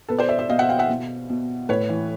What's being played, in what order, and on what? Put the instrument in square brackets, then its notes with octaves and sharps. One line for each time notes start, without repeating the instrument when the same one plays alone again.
[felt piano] B2 A4 B4
C5 D5
D5 E5
D5 E5
B2 D#5 F5
E5 F#5
F5 G5
E5 F#5
B2
B2
A2 B4 C#5
E3